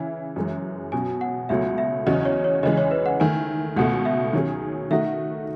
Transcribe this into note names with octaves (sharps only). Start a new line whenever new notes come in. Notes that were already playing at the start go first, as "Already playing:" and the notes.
Already playing: C#3 E3 E4 E5
F#2 E3 G#3
B2 F#3 C#4 G#5
F#5
C#2 B2 F#3 A3 E5
E5
E2 C#3 F#3 C#4 F#4 D#5
C#5
C#5
C#3 E3 G#3 D#5
C#5
B4
F#5
D#3 A3 E4 G#5
C#2 B2 A3 F#5
E5
D#3 F#3 C#4 G#4
D#3 A3 D#4 F#4 E5